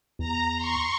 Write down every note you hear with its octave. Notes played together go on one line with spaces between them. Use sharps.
E2 A#5
C6 C#6